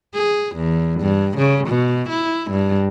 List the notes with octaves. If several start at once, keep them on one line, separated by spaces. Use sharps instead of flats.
G#4
E2
G2
C#3
B2
E4
G2